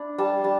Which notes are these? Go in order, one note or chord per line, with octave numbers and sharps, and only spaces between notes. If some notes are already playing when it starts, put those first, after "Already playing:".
Already playing: D4 E4 D5
G3 A5
G3 A5